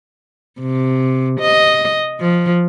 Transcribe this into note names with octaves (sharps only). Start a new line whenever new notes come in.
C3
D#5
F3